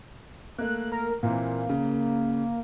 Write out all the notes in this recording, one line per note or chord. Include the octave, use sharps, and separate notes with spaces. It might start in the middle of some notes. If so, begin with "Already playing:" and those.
A3 A#3 F#6
A#4
A#2 E3 A#3 C4
C#3